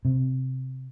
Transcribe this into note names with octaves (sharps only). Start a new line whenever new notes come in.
C3